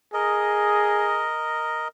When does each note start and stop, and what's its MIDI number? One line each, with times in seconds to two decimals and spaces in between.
0.14 1.29 68
0.14 1.88 70
0.14 1.88 75